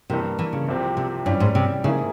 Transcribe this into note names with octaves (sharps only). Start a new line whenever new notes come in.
G2 C3 E3 A#3
E3
C#3
C2 C3 F3 C4 G4
C3
G2 E3 G3 C#4
G#2
C3
G#2 C#3 E3 A#3 E4 G#4